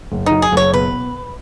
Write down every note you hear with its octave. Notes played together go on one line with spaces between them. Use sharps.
F#1
D#4
F#3
G#4
F#1 C#5
B2 B4